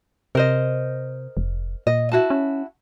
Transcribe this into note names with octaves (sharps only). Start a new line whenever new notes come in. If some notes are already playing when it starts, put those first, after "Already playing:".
C3 A#4 C5 D#5
F1
A#2 D#5
E4 F#4 A5
C#4